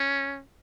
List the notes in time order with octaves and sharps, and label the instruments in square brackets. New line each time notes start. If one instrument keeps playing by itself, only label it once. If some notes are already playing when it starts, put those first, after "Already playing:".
Already playing: [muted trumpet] C#4